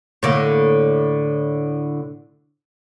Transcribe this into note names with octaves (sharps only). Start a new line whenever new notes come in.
A2 D3 A#3